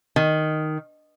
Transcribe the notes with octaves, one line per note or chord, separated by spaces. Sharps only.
D#3